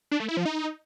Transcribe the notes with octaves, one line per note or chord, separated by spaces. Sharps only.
D4
A3
E4
F3
D#4